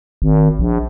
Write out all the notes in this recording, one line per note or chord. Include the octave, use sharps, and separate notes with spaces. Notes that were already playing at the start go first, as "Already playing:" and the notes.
G#1
A#1